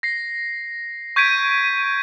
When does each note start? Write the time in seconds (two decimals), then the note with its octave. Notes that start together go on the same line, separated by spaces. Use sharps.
0.03 A#6 C7
1.16 C#6 G6 G#6 B6 D7 D#7